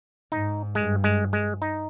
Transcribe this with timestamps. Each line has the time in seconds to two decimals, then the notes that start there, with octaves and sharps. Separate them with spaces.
0.32 G#2 D#4
0.75 G2 G#3
1.04 G#3
1.33 G#3
1.62 D#4